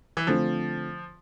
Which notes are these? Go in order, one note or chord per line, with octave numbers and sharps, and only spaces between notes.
E3
D3 F3 A3 C4 F4